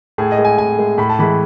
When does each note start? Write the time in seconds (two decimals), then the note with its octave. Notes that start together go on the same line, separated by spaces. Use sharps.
0.18 A2 G#4
0.32 D#5
0.38 G#3
0.45 G#5
0.58 A2 G#5
0.78 G#3
0.98 A2 B5
1.09 A5
1.19 E3 G#3 B5